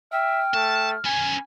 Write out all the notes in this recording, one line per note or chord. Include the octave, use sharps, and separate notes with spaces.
E5 G5 F6
A3 A5
B3 C#4 G#5